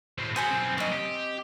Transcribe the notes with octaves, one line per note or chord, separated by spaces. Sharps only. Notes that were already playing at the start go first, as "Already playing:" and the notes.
A2 C4
F#4 G#4 C5 G#5 B5
B1 C4
F#3 A#3 C4 D#5
G4